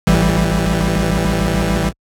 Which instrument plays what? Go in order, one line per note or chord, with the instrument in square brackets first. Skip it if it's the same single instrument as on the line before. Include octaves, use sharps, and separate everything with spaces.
[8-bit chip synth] A1 E3 G3